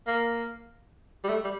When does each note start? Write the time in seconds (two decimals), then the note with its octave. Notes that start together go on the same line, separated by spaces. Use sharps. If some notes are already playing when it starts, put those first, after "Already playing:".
0.07 A#3
1.24 G3
1.29 A3
1.44 G3